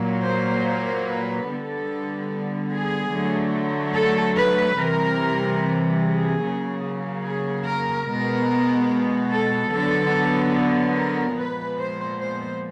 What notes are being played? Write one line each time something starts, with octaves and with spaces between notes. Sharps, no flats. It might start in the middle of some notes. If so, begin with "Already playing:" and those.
Already playing: A#2 F#3 A#3
C5
C5
B4
D3 G3 B3 A4
G#4
D3 F#3 A3
A4
B4
C3 E3 G3 A#4
G#4
C#3 F#3 A#3
G#4
A#4
B2 G#3 B3 A#4
A4
D3 F#3 B3 A4
A#4
A#2 F3 G#3 B3 B4
C5
C5